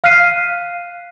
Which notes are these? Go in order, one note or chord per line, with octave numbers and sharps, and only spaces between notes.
F5 F6 F#6 B6 C7 D#7